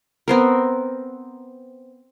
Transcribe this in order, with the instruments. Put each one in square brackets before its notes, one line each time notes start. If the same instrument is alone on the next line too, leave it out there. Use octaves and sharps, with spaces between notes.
[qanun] B3 C4 A#4